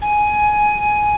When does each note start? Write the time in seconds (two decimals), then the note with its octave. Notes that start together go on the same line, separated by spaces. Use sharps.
0.02 G#5